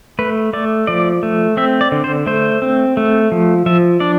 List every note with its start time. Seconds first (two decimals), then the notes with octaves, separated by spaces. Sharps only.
0.19 A3 B4
0.53 A3 D5
0.87 F3 D5
1.23 A3
1.57 C4 E5
1.81 D5
1.92 D3
2.04 C5
2.26 A3 C5
2.62 C4
2.97 A3
3.32 F3
3.66 F3 E5
4.00 D4 D5